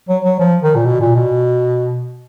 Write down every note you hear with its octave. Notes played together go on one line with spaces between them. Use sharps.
F#3
F#3
F3
D#3
A#2
B2
A#2
B2